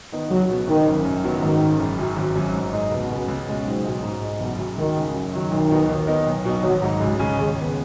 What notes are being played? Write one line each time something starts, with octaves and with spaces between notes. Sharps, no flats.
D#3 B3 D#4
C#2 F#3
B2 F#3 B3
G#1 D#3
F#2 C#3
F#2
D#3 F#3 B3
G#2 D#3
G#3 C#4
F#1
F#2 F#3
G#1
F#2 F#3
G#2
G#3 D#4
C#2 B2
C#3 B3
C#2
B2 G#3 C#4
B1 G#2
B2 G#3 D#4
G#2
G#3 D#4
F#1 B2
F#2 F#3 C#4
C#2 D#3
C#3 G#3
F#2
D#3 F#3
B1 D#3
B2 B3 D#4
D#2
D#3 B3 D#4
B1
B2 F#3 B3 D#4
G#1 F#3
G#2 F#3 D#4
C#2 G#3
C#3 G#3 C#4
D#2 G#3
C#3 B3